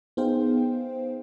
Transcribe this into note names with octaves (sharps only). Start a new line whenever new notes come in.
B3 D#4 G#4 C5 F5 G5